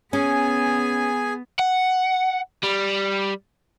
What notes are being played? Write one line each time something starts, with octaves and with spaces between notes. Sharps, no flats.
B3 C#4 G#4 G#5
F#5
G3